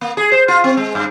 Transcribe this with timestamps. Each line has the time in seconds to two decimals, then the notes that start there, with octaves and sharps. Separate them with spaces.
0.01 A#3
0.17 G#4
0.32 C5
0.48 F4
0.64 C4
0.77 G#3
0.95 G2